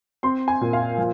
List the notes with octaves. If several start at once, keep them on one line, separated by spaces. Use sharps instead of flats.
C4 C6
G#5
A#2
F5
F3